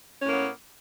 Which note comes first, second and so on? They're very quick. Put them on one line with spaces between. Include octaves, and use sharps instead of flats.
C#4 A2 A#3 B3